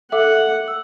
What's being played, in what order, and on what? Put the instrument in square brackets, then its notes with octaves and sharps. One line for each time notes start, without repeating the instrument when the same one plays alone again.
[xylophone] A4 E5 D6 [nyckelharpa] F#5
[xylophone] E6